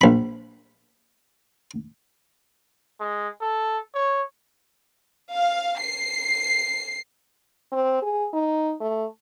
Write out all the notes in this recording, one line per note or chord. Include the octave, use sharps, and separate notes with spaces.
A#1 B5
G#3
A4
C#5
F5
C7
C4
G#4
D#4
A3